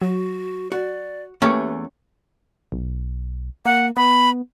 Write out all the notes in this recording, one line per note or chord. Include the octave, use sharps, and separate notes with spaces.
F#3 F#4
F#4 D5
E2 A3 A#3 C#4 G4 B4 A5 C#6
B1
A#3 F#5
B3 B5